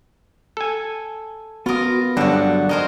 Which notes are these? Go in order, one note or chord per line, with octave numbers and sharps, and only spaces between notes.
A4 G#5
B3 F4 F#4 A#4 D#6
G2 D3 F#3 F#4
D#4 A#4 C5 D#5 G#5